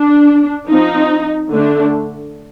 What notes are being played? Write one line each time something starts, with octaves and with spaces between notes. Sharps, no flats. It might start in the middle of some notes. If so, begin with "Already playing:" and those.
Already playing: D4
F3 C4 D#4
D3 A3 D4